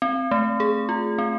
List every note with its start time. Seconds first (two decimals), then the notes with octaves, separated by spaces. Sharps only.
0.02 C4
0.31 A3
0.60 G#4
0.89 F4
1.18 C4